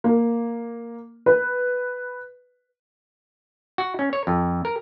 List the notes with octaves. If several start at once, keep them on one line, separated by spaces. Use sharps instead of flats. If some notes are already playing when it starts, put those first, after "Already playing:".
A#3
B4
F#4
C#4
C#5
F2
A#4